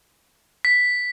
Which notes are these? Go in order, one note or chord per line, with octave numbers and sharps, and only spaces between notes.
B6